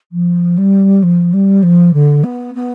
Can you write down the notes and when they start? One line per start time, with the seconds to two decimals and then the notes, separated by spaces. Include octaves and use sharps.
0.12 F3
0.58 G3
1.03 F3
1.33 G3
1.63 F3
1.93 D3
2.24 B3
2.55 B3